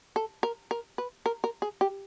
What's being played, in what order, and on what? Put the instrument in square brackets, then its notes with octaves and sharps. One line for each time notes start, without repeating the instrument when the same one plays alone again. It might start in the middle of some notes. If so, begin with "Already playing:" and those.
[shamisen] A4
A#4
A#4
B4
A#4
A#4
G#4
G4